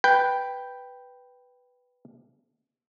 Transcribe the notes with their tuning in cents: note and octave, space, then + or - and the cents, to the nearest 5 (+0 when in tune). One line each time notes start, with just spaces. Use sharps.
B4 +0 G5 +0